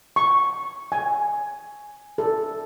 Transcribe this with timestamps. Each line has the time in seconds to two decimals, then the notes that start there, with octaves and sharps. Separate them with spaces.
0.16 C#6
0.92 G#5
2.18 A4